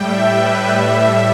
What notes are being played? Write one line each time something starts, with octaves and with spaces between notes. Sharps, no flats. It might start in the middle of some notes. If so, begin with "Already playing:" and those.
Already playing: A2 G3 E5 G5
B4
A2 G3 E5